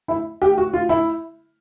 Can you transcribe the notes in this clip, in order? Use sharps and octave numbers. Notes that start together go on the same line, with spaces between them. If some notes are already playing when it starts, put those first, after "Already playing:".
E4
G4
F#4
F4
E4